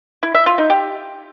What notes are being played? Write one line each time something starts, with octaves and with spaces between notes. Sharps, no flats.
E4
E5
F4
D#4
G4